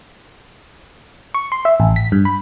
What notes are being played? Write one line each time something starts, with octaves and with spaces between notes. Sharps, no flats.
C#6
C6
E5
A1
B6
G2
B5